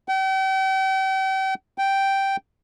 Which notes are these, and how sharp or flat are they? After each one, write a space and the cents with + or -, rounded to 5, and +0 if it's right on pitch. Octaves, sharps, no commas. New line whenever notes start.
G5 -40
G5 -5